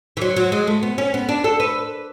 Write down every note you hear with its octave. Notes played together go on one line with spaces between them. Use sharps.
E3
F#3
F#3
G#3
A3
B3
C#4
B3
D4
A4
B4